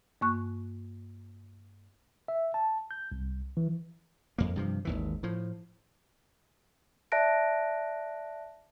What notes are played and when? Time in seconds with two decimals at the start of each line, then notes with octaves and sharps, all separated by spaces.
0.21 G2 A#3 C#6 F#6
2.28 E5
2.54 A5
2.91 G6
3.12 C2
3.57 E3
4.38 F2 A#3
4.56 G2 C3 F3
4.85 G#1 D#2 E3
5.23 A2 F3
7.12 D5 E5 A5 F#6 A#6 D7